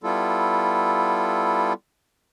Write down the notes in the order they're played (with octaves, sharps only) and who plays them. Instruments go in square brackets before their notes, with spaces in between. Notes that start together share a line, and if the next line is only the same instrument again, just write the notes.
[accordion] G3 B3 E4 F4 A4